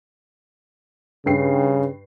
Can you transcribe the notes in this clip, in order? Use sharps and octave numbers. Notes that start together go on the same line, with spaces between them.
G2 C#3 G5 C7